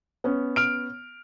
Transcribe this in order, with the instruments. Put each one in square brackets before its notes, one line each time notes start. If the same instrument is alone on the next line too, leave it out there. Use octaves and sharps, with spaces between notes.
[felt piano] B3 C#4
[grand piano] F6 D7